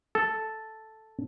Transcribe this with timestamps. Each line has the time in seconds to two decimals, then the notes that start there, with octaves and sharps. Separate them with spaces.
0.15 A4